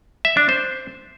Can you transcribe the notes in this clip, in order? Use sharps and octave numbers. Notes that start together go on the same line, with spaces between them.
E5
D4
C5